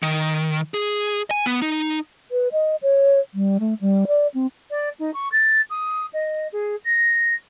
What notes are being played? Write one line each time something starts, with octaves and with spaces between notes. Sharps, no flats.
D#3
G#4
G#5
B3
D#4
B4
D#5
C#5
G3
A3
G3
D5
C4
D5
D#4
C#6
A6
D#6
D#5
G#4
A#6